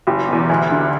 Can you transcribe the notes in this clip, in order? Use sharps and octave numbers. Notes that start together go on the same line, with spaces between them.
F#1 G4
E2 B2
D2
D3